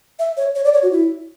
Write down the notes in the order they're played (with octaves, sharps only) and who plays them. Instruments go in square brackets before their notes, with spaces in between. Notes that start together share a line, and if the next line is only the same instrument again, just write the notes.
[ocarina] E5
C#5
C#5
D5
C#5
F#4
E4